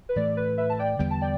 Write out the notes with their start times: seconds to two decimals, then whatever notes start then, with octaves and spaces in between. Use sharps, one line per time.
0.09 B4
0.16 A2 E3 A3 D5
0.37 B4
0.57 B4 E5
0.70 A5
0.79 D5 G5
0.99 E2 D3 G3 B3 G5
1.11 A5
1.21 D5 G5